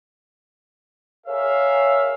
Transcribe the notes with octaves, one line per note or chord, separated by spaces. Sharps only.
G#4 A#4 C#5 E5 F5